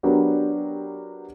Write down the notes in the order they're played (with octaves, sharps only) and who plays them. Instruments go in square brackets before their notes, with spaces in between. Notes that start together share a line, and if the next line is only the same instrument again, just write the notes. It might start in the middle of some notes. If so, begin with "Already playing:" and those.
[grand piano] F#3 B3 D4 G4 A#4